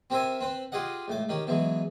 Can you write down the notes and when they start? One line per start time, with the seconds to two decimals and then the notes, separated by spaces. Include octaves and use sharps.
0.10 C4 G4 A#4 C5 E5 G#5
0.40 C4 B4 C5
0.72 F4 G4 G#4 D#5 F#5
1.08 C#2 A2 D6
1.29 D#3 C#4 G4
1.47 B2 E3 F#3 G#3